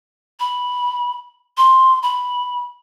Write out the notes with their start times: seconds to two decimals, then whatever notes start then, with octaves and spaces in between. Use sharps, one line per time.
0.40 B5
1.57 C6
2.03 B5